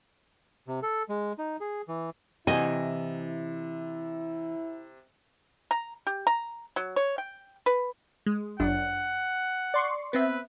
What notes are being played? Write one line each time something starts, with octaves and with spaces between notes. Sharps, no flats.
C3
A4
G#3
D#4
G#4
E3
C3 E3 E4 D#5 G#5
A#5
G4
A#5
F#3
C#5
G5
B4
G#3
G1 F#2 D4 F#5
D5 C6 C#6
B3 C4 B4 E5